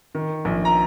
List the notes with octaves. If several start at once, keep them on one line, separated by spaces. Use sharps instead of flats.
D#3
A#1
A#5